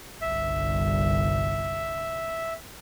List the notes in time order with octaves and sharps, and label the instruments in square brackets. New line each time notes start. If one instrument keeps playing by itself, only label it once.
[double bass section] G1 C2 [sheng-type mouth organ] E5